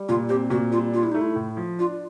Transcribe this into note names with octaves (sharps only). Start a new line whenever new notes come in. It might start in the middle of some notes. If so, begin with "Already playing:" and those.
Already playing: G3
A#2 F4
C4 G4
A#2 F#4
G3 F4
D4 F4
E4
A3 D#4
E4
A2
F3
D4 F4